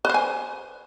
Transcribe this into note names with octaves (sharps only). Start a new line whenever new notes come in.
B4 C5 G#5